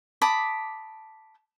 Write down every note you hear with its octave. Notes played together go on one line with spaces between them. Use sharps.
A5 B5 D6 D#6